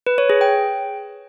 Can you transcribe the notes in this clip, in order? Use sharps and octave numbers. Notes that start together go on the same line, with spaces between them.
B4
C#5
G#4
G5